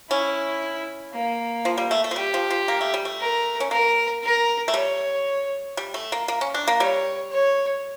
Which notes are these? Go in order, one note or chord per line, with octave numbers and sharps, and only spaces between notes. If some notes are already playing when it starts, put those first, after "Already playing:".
C#4 E4
A#3
F3
G3
A3
A3
F3
G3 G4
F3
F3
A#3
A3
G3
A3
A#4
C#4
A#3 A#4
A#4
A3
G3 C#5
G3
A3
A#3
A#3
C#4
D4
A#3
G3 C#5
C#5